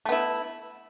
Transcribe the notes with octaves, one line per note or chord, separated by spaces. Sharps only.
A3 B3 E4